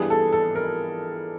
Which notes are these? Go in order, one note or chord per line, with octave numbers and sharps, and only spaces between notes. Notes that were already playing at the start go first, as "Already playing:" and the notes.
Already playing: G2 E3 G3 B3 D4 G#4
A4
A4
A#4